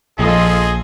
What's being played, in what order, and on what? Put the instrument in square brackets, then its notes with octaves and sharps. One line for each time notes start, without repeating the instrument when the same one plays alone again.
[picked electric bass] A#1 [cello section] F3 F4 A4 [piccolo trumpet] G#4 [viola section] D#5